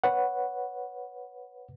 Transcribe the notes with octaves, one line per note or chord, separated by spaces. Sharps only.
B4 C#5 F#5